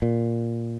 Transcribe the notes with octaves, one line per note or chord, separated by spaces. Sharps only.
A#2